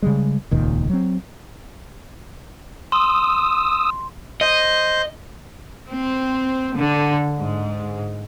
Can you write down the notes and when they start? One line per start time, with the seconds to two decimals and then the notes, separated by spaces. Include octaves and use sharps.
0.02 C#3 G3 G#3
0.51 D#1 C#2 A#2 D#3
0.90 F#3 C4
2.92 C6 D#6 E6
4.41 C5 D#5
5.89 C4
6.76 D3
7.38 G#2